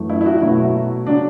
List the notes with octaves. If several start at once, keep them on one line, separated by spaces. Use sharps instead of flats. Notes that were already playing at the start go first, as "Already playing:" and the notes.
Already playing: F#2 E3 A3
E4
E4
F#4
B2 F#3 A3 E4
C#3 F#3 D4